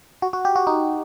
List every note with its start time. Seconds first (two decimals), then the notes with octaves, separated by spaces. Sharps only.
0.22 F#4
0.33 F#4
0.45 G4
0.56 F#4
0.67 D#4